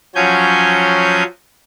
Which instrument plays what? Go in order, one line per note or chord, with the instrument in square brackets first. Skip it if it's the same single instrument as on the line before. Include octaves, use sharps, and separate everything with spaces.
[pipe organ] F3 F#3 C#4 G#5 G6